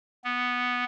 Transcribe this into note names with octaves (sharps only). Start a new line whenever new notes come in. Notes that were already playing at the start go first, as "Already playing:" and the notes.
B3